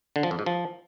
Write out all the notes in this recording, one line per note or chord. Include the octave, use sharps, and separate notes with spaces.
D3
F3
F2
G#2
F3